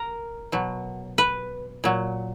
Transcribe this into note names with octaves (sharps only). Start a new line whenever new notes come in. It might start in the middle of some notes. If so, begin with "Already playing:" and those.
Already playing: A#4
B2 F#3
B4
A#2 F#3